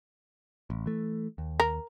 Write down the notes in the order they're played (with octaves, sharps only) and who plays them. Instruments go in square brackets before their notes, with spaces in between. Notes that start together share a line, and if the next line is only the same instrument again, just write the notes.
[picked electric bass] A1
E3 A3
D#2
[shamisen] A#4